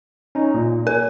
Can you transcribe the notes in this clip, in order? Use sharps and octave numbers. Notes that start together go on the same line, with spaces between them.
C#4 D#4
A#2
A#4 G#5